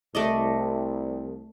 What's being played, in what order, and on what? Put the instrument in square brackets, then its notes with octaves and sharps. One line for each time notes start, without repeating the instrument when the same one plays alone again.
[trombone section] C2 [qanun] A3 D5 D#5